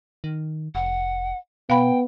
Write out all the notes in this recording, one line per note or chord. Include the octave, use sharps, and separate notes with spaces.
D#3
F1 F#5
B2 B3 F5 G5 B5